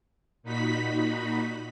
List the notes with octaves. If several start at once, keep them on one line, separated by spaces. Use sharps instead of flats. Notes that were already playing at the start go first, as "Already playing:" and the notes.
A#2 D#4 F#4 B5 B6